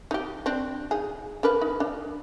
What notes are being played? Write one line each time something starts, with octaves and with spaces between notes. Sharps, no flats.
D#4 G4
C4 D4
D#4 G#4
D4 A#4 B4
D#4
D4